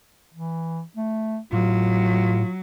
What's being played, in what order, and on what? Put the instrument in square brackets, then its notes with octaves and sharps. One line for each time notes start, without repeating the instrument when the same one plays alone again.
[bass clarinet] E3
A3
[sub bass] A2 [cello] F#3 [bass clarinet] F4